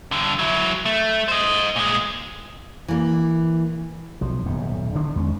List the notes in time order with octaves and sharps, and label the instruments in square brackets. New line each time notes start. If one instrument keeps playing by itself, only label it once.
[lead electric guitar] G2 D3
F#3 E4
A3
C5 D#5
A#2 G#3
[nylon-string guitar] E3 A#3
[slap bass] B1 F3
D#1 B1 F#2 A2
D3 D#3 D4
E2 G#3 C#4